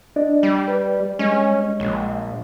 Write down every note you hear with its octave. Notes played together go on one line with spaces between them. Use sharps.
D4 D5 D#5
G3
B4
G3 G#3 C#4 D#5
A#1